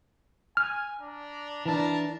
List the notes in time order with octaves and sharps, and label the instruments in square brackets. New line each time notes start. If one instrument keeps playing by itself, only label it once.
[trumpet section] G#5 [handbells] F6
[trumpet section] D4 A#5
[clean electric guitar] E3 D4 [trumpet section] A#4 A5